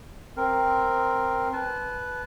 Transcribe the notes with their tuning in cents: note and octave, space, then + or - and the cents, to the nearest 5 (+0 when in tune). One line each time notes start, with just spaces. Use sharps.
C4 +0 A#4 +0
B4 +0 A5 -30